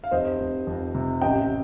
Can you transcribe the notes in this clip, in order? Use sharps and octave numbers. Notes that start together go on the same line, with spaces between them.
F5
F1 C5 D#5
F1
F2
C3
A1 D#5 G5